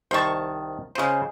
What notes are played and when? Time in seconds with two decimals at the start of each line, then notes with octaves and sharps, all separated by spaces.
0.11 C2 D#3 C5 A5 C#6
0.95 C#3 F3 G#3 C5